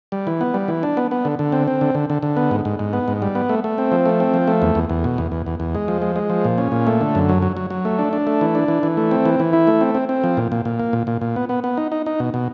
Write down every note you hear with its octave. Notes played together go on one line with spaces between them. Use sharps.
G3
E3
B3
G3
E3
D4
B3
B3
D3
D3
C4
C4
D3
D3
D3
D3
B3
G#2
G#2
G#2
B3
G#2
G3
B3
A3
A3
C4
F3
A3
C4
F3
A3
E2
E2
E2
B2
E2
E2
E2
E2
G#3
F3
G#3
G#3
F3
A#2
C#4
A#2
A3
D3
F#2
F#3
F#3
F#3
F#3
A3
D4
D4
A3
E3
D4
E3
E3
A3
C4
E3
E3
E4
A3
C4
C4
C4
F3
A#2
A#2
A#2
A#3
A#2
A#2
A#2
B3
B3
B3
D#4
D#4
D#4
B2
B2